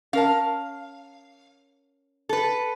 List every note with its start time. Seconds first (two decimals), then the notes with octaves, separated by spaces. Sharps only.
0.13 C#4 A#4 F5 A5
2.29 A4 B4